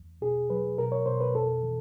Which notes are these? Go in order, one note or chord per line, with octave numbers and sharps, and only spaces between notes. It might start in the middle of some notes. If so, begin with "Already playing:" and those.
Already playing: E2
B2 G#4
F#3 B4
B2 A#4
C#5
B2 C5
B4
F2 A4
E3